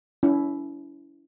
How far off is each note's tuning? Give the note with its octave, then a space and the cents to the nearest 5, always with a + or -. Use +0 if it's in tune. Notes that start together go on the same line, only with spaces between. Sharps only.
C#4 +40 E4 +0